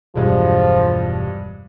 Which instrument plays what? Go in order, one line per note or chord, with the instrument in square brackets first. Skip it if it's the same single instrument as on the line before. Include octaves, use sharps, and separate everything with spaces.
[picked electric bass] E1 B2 E3 [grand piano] G2 G#3 [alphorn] F3